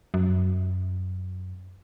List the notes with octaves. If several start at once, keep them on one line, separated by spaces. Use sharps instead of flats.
F#2